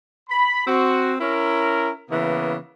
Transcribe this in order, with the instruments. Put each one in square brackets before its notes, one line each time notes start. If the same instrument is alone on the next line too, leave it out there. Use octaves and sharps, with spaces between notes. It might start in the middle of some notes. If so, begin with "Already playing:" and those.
[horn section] B5
C4 F#4
C#4 E4 A#4
C#3 E3 A#3 B3